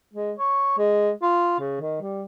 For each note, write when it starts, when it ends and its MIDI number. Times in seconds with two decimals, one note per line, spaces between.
0.14 0.32 56
0.39 0.76 73
0.78 1.11 56
1.22 1.55 65
1.60 1.77 49
1.81 1.98 51
2.01 2.24 55